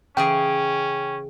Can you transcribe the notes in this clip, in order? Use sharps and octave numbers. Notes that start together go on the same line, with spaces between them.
C#3 E3 C#4 G#4 G5